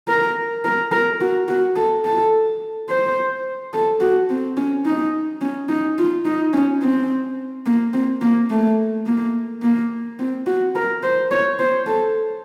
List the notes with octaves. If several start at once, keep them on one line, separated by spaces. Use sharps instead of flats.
A#4
A#4
A#4
F#4
F#4
A4
A4
C5
A4
F#4
C4
C#4
D#4
C#4
D#4
F4
D#4
C#4
C4
A#3
C4
A#3
A3
A#3
A#3
C4
F#4
A#4
C5
C#5
C5
A4